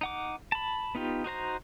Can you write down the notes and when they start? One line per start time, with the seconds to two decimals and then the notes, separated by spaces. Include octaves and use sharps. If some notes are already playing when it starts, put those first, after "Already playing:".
0.01 D#4 F#5 D6
0.52 A5 B5
0.95 B3 D#4 F4 G4
1.24 D#4 F#4 C5 A#5